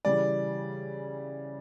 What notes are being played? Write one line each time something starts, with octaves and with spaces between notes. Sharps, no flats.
C#3 E3 G3 D5